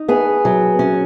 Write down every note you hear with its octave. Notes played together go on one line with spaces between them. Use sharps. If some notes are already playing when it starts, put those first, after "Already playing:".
Already playing: D#4
B3 G#4
F#3
C#4